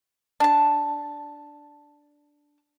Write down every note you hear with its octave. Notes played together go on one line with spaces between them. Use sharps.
D4 A5